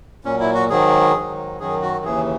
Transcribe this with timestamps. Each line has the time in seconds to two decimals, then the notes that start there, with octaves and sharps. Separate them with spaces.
0.24 A#2 F#3 C#4
0.40 E4
0.54 F#4
0.70 G#2 D#3 F#3 G#4
1.14 G#2 D#3 F#3
1.60 F#2 D#3 F#3 G#4
1.82 F#4
2.04 D#2 C#3 E3 G#4